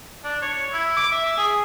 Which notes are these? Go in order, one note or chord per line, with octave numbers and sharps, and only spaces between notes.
D4
C#5
E4
D6
E5
G#4